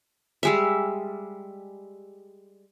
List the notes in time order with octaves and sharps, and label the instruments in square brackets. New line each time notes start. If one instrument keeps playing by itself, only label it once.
[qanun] G3 G#3 E5